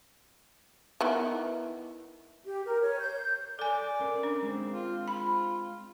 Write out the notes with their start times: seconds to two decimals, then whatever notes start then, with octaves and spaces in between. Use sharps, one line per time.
1.01 D#3 E3 B3
2.45 G4
2.65 A#4
2.82 C#5
2.99 G6
3.59 A4 D5 G#5
4.00 C#4 A#4
4.23 D4
4.43 G#3 C4
4.72 F4
5.08 F4 B5